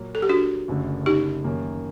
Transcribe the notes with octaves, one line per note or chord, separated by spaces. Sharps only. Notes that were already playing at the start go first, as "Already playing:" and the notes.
Already playing: A#2 F#3 A#3
A4
G4
D4 F#4
F#1 F#2 D3 A3
D#4 G4
F#2 D#3 F#3 A#3